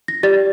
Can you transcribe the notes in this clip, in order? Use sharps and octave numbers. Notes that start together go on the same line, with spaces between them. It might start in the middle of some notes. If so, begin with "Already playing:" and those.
A#6
G4 D5 A6